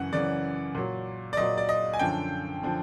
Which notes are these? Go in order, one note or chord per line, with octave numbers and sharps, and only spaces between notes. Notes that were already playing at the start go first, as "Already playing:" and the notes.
Already playing: F#2 C#3 E3 F#5
F#2 C#3 E3 D5
A#2 F#3
D5
A#2 F#3 D#5
D5
D#5
G#5
F#2 D3 F3 G5
D3 F3